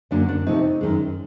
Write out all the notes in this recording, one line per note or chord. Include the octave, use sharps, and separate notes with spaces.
F#2 D3 F#3 A#3 D4
D4
C3 F3 A3 D#4
F#2 D#3 G#3